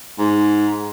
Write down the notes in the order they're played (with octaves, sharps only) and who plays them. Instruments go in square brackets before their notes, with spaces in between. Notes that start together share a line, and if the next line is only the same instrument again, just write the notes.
[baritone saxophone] G#2